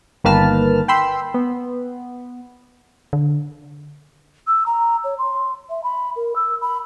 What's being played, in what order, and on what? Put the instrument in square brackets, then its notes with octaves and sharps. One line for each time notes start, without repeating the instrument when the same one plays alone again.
[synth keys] G1 D#3 A#3 B4 A5 F6
G5 B5 C6 E6
B3
[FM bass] D3
[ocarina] E6
A#5
C#5
C6
E5
B5
A#4
E6
B5